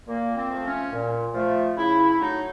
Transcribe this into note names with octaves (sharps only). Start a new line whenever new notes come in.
A#2 A#3
C4
F3 A3
C#4
A#2
F3 A3
C#3 E4
E4
F#3 A3 D#4